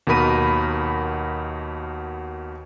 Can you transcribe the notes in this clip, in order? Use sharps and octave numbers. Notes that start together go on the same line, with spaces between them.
D#2 B2 A#4 B5 D#7